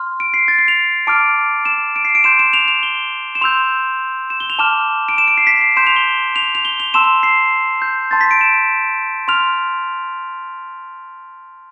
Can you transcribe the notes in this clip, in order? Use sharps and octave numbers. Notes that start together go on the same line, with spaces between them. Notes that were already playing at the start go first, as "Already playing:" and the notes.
Already playing: C6 F6
D7
C7
A6
C7
F7
A5 D6 F6 D7
E7
D7
C7
D7
C6 G6 E7
E7
F7
F7
G7
E7
C6 E6 G6 F7
E7
G7
F7
A5 D6 F6 E7
D7
E7
D7
C7
B6
C7
C6 G6 E7
F7
G7
F7
F7
G7
F7
A5 C6 E6 E7
E7
C7
G6
A5 C6 G6 A6
B6
D7
E7
C6 F6 F7